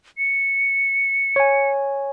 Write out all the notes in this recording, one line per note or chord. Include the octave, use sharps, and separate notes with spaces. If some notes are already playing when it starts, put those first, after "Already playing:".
C#7
C#5 G#5